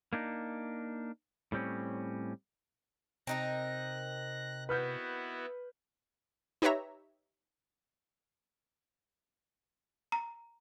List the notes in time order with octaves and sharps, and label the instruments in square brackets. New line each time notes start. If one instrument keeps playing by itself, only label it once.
[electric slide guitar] A#3 D4 D#4
A2 G3 C4 C#4
[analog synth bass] C3 [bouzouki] C4 D#4 A#4 [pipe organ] F#6 A#6
[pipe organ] B3 E4 F#4 [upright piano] B4 F6 G6
[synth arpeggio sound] D#4 G4 B4 C#5 E5 A#5
[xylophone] A#5